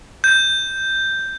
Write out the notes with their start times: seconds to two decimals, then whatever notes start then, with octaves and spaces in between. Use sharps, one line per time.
0.24 G6